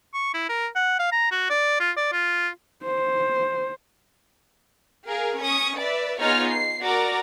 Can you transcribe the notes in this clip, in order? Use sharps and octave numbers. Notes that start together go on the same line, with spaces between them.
C#6
E4
A#4
F#5
F5
A#5
F#4
D5
F4
D5
F4
C5
G#4 A#4 F5
C#4 C#6 D#6
B4 D5 E5
B3 D#4 F4 G#4 C#5 F6
C7
F#4 A#4 D5 A#5 D6